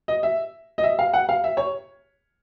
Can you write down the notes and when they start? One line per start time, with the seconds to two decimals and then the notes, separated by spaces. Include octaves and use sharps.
0.08 D#5
0.23 E5
0.78 D#5
0.83 E5
0.99 F5
1.14 F#5
1.29 F5
1.44 E5
1.57 C#5